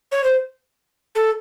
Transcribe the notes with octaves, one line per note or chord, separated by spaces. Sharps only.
C#5
C5
A4